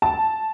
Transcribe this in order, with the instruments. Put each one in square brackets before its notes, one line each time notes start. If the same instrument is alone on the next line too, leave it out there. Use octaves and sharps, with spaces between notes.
[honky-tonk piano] A5